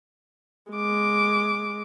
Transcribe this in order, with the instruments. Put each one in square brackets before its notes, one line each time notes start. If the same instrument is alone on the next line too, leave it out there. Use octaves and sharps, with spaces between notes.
[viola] G#3 D6